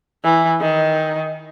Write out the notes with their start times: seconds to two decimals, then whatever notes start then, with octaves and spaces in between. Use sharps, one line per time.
0.24 E3
0.61 D#3